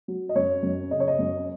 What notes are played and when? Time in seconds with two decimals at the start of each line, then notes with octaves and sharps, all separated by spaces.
0.08 F#3
0.29 D#5
0.36 F#2 C#5
0.63 F#2
0.91 C#3 D#5
1.00 C#5
1.08 D#5
1.19 F#2